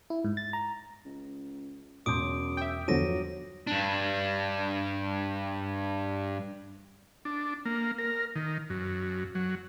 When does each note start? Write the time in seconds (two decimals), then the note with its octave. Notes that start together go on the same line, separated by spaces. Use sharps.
0.10 E4
0.25 G#2
0.37 A6
0.53 A#5
1.05 C#2
2.06 E1 F#2 C6 D6 D#6 G6 D7
2.57 E5 G5
2.88 E2 G2 D3 F3 F#3 A#6 D#7
3.67 G2 D4
7.25 D4
7.65 A#3
7.98 A#4
8.36 D#3
8.70 F#2
9.35 F#3